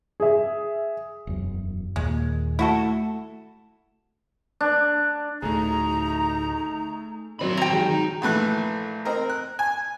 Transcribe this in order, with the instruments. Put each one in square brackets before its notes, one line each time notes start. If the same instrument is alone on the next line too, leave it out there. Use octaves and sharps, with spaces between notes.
[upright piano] G#4 E5
[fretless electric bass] E1 F#2
[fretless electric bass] D#2 A#2 [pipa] G#3
[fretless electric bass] A3 [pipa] E4 F#4 A4
[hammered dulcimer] D4
[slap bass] D1 D2 [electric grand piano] A3 G#4 [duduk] D#4 [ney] A#5
[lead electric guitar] D#3 B5 [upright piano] F#3 C4 D#4
[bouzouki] G5 A#5
[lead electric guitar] D#3 [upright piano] F#3 G#3 F#4
[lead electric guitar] D#4
[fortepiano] A#1 E3 A3 F#6
C4 D#4 A#4
F#6
G#5